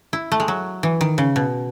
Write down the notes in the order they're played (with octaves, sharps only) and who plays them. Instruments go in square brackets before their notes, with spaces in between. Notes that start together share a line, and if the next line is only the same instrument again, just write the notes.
[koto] E4
A3
G#3
F#3
E3
D#3
C#3
B2